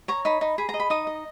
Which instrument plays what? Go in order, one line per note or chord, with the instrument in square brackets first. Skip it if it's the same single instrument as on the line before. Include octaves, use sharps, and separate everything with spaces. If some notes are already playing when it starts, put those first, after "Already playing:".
[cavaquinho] C#5 A#5
D#4 B5
D#4
G#4 B5
A#5
D#5
B5
D#4 D#6
D#5